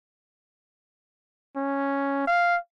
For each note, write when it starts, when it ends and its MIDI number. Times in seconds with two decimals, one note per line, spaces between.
1.56 2.23 61
2.27 2.57 77